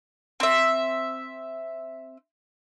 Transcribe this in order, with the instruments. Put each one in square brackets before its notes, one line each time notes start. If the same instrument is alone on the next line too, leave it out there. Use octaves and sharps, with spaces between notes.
[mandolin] C4 E5